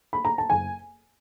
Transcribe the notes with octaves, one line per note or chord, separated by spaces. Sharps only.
B5
A#5
A5
F#1 G#5